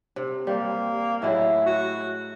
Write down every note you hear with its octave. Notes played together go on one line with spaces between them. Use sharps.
C3
G3 A#3 C5
A2 F#3 G#3 E4
F#4